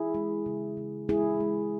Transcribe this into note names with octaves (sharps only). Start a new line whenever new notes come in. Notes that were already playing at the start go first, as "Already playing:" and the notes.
Already playing: E4 G#4
G#3
C#3
C#3
G#3 E4 G#4
G#3